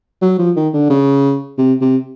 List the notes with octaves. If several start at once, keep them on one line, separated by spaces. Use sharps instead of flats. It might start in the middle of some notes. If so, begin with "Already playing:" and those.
F#3
F3
D#3
D3
C#3
C3
C3